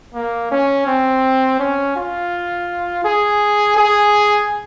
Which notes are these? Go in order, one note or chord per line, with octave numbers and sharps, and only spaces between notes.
A#3
C#4
C4
C#4
F4
G#4
G#4